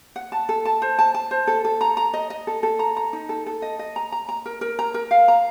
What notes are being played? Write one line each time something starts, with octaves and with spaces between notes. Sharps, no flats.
F#5
A5
A4
A5
C5
A5
A5
C5
A4
A4
A#5
A#5
D#5
D#5
A4
A4
A#5
A#5
D#4
A4
A4
D#5
D#5
A#5
A#5
A#5
A#4
A#4
A#5
A#4
F5
A#5